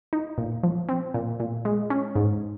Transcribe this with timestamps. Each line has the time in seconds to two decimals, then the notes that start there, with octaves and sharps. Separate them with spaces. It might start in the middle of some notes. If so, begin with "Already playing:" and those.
0.13 D#4
0.38 A#2
0.63 F3
0.89 C4
1.14 A#2
1.40 A#2
1.65 G#3
1.90 C#4
2.15 G#2